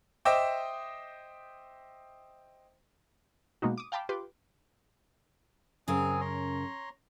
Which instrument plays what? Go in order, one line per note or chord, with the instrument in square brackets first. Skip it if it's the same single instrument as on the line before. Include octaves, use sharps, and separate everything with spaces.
[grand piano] C5 D#5 E5 G5 D6
[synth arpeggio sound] B2 G#3 A#3 B3 D#4 F#4
D6 D#6
F5 G5 A5 B5 D6
F4 G4 B4 C6 D6
[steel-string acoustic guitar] F#2 C#3 A#4 [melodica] C4 G#4 G#5
[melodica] C#5 A#5 C6